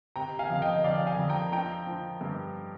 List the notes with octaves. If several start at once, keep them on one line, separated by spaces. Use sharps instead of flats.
C3 G5 A#5
F5 G#5
F2
F5
D#5 G5
F2 D5 F5
F5 G#5
F2
G5 A#5
F3 G5 A#5
F3
G2